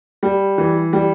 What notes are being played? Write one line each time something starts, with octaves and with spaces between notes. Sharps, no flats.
G3
E3
G3